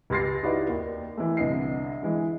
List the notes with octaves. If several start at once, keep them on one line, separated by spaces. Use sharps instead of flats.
C#2 G4 C6 A6 A#6 C7
D#4 E4 F#4 G4 B4 D5
D#2
E3 A3
C2 D3 B3 D#5 C7
E3 G#3